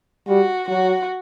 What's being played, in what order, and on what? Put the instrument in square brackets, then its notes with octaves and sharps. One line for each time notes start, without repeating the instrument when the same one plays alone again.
[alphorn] G3 [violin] F#4
[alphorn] F#3 [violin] F#4